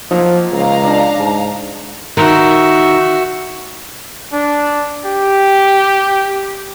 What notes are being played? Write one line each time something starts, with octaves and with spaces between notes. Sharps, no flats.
F3 F#3 A#3 D#4
C#2 F5 A#5
D4
G#2 A5
D#3 F#4 E5
D4
G4